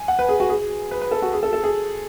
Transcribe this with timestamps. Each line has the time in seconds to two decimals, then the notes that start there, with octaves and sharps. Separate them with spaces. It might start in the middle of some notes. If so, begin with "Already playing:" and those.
Already playing: G#5
0.08 F#5
0.19 B4
0.29 G#4
0.40 F#4
0.49 G#4
0.91 B4
1.01 B4
1.11 A4
1.22 F#4
1.33 G#4
1.43 A4
1.53 A4
1.64 G#4